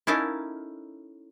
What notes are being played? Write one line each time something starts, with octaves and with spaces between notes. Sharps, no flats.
C#4 D#4 E4 A4 A#4 F5